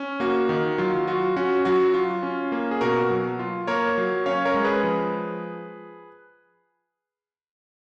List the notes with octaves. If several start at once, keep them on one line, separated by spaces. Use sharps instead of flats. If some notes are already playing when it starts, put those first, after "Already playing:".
Already playing: C#4
A#3 F#4
D#3
F#3 F4
F4 F#4
C#4 F#4
F#3 F#4
F4
C#4
A#3
G#4
B2 F#4 A#4
F#3
F4
A#3 A#4 C#5
F#3
C#4 C#5 F5
A#4 C#5
G#3
G#4 B4
F3